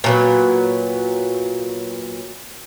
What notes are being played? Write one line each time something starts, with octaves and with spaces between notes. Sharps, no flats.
A#2 F#3 B3